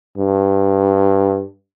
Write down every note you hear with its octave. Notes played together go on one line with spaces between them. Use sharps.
G2